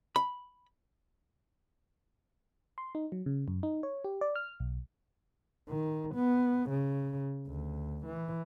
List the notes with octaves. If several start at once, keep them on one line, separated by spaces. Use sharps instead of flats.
B5
C6
D#4
F#3
C#3
F#2
D#4
C#5
G4
D5
F6
B1
D#3
B3
C#3
D2
E3